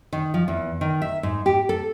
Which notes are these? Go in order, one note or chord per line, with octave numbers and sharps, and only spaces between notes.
D#3
F3
E2
D#3
E5
G#2
G4
A4